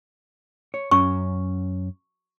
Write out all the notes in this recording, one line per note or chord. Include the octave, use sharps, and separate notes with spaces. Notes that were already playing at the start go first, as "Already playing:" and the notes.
C#5
F#2 C#4 C#6